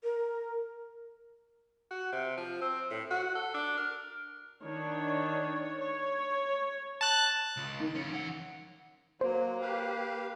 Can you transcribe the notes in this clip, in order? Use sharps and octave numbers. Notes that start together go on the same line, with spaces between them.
A#4
F#4
C3
F3
C4
A2
F#4
A4
D4
A#4
D#3 D4 C#5
C#5
A5 F#6
C#2
D#3
F2 C#4
E3 F#5
F#3 A#3 C5
G4 B4 F5